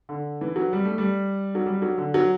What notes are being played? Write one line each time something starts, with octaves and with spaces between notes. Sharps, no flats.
D3
E3
F#3
G3
A3
G3
F#3
G3
F#3
D3
F#3